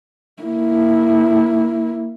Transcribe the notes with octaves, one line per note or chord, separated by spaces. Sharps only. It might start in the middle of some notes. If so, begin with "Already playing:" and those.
A#3 E4